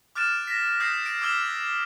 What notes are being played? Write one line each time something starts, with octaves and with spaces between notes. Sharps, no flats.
D6 F6 F#6 A6 D7 E7
A#6 B6
D#6 F#6 G6 A#6 C7 E7
D7
D6 E6 F6 G#6 E7 G7